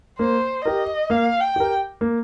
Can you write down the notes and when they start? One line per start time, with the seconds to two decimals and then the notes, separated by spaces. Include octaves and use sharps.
0.19 A#3 C5
0.65 G4 A#4 D#5
1.10 A#3 F5
1.41 G5
1.56 G4 A#4
2.01 A#3